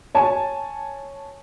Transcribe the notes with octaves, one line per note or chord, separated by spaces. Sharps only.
C#5 G#5 A5